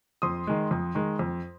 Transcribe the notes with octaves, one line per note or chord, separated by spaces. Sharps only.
F2 C6 D#6
D#3 G#3
F2
D#3 G#3
F2